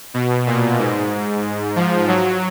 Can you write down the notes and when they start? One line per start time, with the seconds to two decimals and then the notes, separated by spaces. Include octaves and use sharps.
0.14 B2
0.47 A#2
0.79 G#2
1.76 F3
2.08 F#3